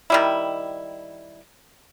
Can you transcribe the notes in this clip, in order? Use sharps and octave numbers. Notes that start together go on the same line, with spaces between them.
D#3 G3 E4